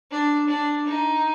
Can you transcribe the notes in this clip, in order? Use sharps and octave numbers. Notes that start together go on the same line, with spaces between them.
D4
D4
D#4